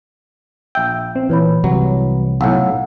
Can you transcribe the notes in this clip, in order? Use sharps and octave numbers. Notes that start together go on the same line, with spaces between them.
A#1 E5 G5 E6
C4
A#2 E3 B4 C#5 B5
C2 C3 F#3 G3
B1 A2 F5 F#5 E6